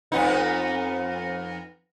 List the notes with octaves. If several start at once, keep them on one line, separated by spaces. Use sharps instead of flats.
F2 B3 D#4